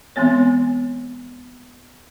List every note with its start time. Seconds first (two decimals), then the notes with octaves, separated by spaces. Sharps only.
0.16 E3 G#3 B3 C4 C#5